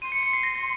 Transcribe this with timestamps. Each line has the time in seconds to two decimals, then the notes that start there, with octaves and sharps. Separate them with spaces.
0.02 C6 D#7
0.12 C#7
0.23 C#7
0.33 C7
0.43 A#6